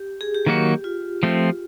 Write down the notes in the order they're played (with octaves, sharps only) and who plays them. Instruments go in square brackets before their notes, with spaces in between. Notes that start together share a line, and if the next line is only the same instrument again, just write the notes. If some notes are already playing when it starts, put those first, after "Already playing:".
Already playing: [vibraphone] G4
G#4
G4
[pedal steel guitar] D#3 F#3 A#3 D#4 F#4
[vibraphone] F4
[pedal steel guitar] F3 A3 C4